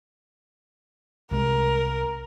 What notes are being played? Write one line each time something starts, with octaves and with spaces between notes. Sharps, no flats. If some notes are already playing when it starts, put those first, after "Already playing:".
C2 C3 G#3 A#4